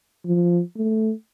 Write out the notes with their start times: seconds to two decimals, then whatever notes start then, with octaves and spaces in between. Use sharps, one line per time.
0.26 F3
0.77 A3